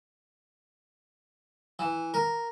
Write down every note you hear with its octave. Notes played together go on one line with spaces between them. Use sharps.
E3
A#4